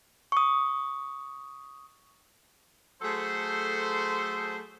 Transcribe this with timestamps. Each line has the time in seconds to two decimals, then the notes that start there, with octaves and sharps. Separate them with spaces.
0.32 C#6 D#6
3.02 F#3 A3 G#4 A4 C5